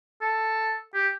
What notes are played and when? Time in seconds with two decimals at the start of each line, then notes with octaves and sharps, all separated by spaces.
0.22 A4
0.94 G4